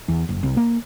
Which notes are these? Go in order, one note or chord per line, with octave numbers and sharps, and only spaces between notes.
E2
F#1
C2
A#3